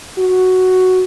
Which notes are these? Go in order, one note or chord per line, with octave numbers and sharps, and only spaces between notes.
F#4